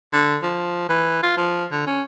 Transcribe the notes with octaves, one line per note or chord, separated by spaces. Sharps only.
D3
F3
E3
F4
F3
D3
C#4